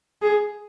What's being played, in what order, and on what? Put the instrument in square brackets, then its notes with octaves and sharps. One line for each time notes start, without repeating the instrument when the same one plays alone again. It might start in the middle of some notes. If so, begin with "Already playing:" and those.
[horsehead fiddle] G#4